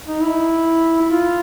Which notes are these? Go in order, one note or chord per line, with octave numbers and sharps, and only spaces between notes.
D#4
E4
E4
F4